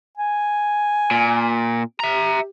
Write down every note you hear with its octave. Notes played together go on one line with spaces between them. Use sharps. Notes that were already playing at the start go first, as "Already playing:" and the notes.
G#5
A#2
G4 E5 A#5